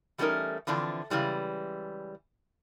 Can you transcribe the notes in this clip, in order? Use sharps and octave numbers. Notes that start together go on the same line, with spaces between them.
E3 G3 A3 C#4 D#4 A#4
D3 E3 F3 C4 D4
C#3 E3 G3 G#3